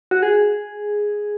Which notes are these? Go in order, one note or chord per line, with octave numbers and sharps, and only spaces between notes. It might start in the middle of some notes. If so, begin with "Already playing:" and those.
F#4
G#4